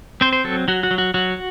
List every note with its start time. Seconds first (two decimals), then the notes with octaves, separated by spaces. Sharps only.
0.21 C4 C5
0.33 C5
0.44 F#3 A4
0.68 F#3 F#4
0.83 F#4
0.91 F#3
0.98 F#4
1.14 F#3 F#4